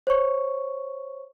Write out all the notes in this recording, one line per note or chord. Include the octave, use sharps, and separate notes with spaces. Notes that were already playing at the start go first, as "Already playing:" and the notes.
C5 C#5 C#6